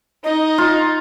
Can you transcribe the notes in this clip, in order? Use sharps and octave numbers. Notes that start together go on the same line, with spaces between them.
D#4 D#5
F4